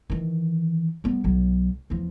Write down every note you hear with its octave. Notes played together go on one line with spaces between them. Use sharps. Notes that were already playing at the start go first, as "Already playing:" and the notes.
D#3 E3
G3 B3
B1 F#3
E2 F3